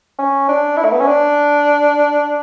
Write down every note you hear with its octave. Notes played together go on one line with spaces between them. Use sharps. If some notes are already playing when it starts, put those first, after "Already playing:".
C#4
D4
E4
A3
B3
C#4
D4